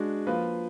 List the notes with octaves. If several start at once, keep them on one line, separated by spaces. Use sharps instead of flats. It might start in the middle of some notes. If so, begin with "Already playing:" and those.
Already playing: G#3 D4 F#4
F3 A#3 F4 B4